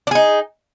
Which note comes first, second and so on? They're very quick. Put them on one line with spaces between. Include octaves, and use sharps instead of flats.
D4 G#4 D#4